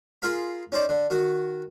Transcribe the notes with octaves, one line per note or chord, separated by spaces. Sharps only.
F4 G#4 A#4 F5 B5
C#4 D#4 C5 D5
D3
D#3 F#4